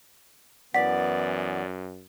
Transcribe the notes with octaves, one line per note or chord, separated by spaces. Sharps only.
F#2 E3 B3 D5 F#5